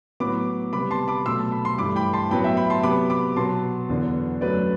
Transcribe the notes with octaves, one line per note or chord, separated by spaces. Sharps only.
A2 F#3 B3 B5 D6
C3 G3 B3 B5 D6
A5 C6
B5 D6
B2 F#3 A3 C6 E6
A5
B5
C6
G2 E3 A3 B5 D6
G5 B5
A5 C6
A2 F#3 B3 G5 B5
E5 G5
G5 B5
A5 C6
C3 F#3 B3 B5 D6
B5 D6
B2 F#3 B3 A5 C6
E2 D3 F#3 B3
F#2 F#3 A3 B4 D5